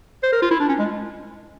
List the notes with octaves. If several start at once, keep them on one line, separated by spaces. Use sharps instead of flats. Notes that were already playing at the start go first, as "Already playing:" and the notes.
C5
A#4
F4
E4
D4
C#4
G#3